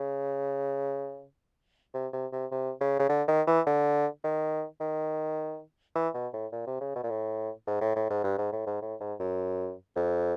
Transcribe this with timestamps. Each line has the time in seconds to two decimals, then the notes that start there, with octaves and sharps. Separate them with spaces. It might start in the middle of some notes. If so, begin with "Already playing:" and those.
Already playing: C#3
1.94 C3
2.13 C3
2.33 C3
2.52 C3
2.81 C#3
2.99 C#3
3.09 D3
3.28 D#3
3.47 E3
3.67 D3
4.24 D#3
4.81 D#3
5.95 E3
6.14 B2
6.33 A2
6.52 A#2
6.67 C3
6.81 C#3
6.96 B2
7.03 A#2
7.10 A2
7.67 G#2
7.81 A2
7.96 A2
8.10 G#2
8.24 G2
8.38 G#2
8.53 A2
8.67 G#2
8.82 A2
9.01 G#2
9.20 F#2
9.96 F2